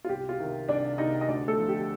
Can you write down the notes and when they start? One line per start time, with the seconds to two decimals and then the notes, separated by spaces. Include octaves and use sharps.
0.04 F4
0.09 C2 G4
0.29 F4
0.39 C3 D#3
0.68 C2 D4 D5
0.98 C3 D#3 D#4 D#5
1.21 D#5
1.28 D2 D4 D5
1.48 A3 A4
1.58 D3 F3
1.68 G4